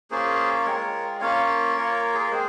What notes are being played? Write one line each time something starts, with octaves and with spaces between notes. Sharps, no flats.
A#3 C#4 F4 G#4 C5
G#3 C4 F4 A#4 C#5
A#3 C#4 F4 C#5 F5
A#3 F4 A#4 C#5
G#4
A#4
G#3 C4 G#4 C5